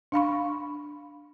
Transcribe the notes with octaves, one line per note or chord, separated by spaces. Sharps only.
D4 F5 B5 C#6